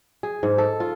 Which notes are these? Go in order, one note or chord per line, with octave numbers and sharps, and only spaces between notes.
G#4
G#2
A4
F4